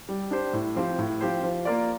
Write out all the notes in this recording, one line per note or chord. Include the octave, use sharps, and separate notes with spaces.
G3
D4 G4 C5
A2
F3 C4 G4 C5
A2
F3 C4 G4 C5
F3
A#3 F4 A#4 D5